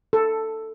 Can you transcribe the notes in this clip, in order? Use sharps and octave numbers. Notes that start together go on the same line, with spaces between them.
A4